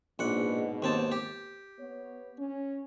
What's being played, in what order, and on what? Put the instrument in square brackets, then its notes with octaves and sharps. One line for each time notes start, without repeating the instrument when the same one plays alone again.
[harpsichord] A#1 F#5 [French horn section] G#2 B2
[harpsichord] D#2 C4 A5
G4
[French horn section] B3 C#5
C#4